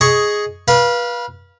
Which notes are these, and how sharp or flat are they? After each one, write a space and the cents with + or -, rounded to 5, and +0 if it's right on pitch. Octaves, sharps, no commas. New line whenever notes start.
G#4 +5 D#5 +0 C#6 +0
B4 -30 F5 +0